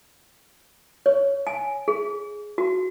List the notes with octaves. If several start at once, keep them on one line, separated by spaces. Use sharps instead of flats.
C#5
G#5
G#4
F#4